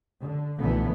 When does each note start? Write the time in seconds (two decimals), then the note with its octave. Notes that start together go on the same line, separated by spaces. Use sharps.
0.21 D3
0.61 B1 A#2 D3 E3 A3 B3